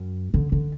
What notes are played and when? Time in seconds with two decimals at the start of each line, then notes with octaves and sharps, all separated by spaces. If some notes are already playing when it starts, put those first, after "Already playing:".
Already playing: F#2
0.34 D3
0.52 D3